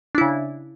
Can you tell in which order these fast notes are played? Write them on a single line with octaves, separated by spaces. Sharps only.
D4 E4 C#3